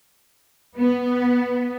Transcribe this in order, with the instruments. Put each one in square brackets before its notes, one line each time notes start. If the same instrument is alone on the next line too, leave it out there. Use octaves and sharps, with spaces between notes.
[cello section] B3